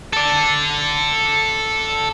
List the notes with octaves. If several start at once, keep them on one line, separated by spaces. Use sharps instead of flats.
A4 D5